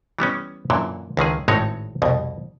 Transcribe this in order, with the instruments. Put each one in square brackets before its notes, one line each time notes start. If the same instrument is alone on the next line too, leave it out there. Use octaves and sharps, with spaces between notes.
[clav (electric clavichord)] E3 G3 B3 C#4
F#2 A#2 D3 E3
C#2 D3 D#3 G#4
G#1 A2 G#3 C4 D#4 C#5
C2 F2 B2